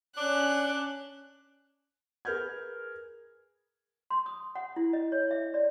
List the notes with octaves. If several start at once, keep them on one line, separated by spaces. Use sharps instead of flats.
C#4 D4 F#6
G#4 A#4 B4 F6 G6 G#6
C6
D#6
F#5
E4
D#5
C#5
E5
D5